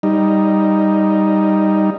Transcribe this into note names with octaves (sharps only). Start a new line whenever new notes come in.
G3 D#4